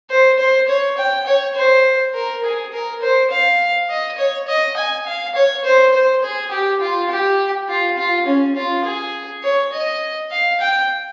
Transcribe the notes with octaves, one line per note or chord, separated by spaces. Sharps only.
C5
C5
C#5
G5
C#5
C5
A#4
G#4
A#4
C5
F5
D#5
C#5
D#5
G#5
F5
C#5
C5
C5
G#4
G4
F4
G4
F4
F4
C#4
F4
G#4
C#5
D#5
F5
G5